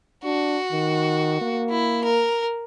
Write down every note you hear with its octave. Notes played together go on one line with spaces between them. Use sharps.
D4 F#4
D#3
A#3
E4
A#4